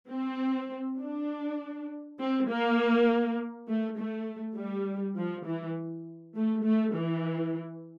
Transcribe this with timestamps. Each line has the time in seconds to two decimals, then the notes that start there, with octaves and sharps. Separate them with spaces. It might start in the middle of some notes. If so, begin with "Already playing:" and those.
0.10 C4
1.00 D4
2.19 C4
2.48 A#3
3.68 A3
3.97 A3
4.56 G3
5.16 F3
5.46 E3
6.35 A3
6.65 A3
6.95 E3